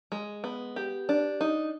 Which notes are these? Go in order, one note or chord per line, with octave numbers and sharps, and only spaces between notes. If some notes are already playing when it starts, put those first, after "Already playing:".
G#3
B3
G4
D4
D#4